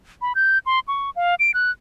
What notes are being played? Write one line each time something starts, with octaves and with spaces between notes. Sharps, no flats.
B5
G6
C6
C#6
F5
D7
F#6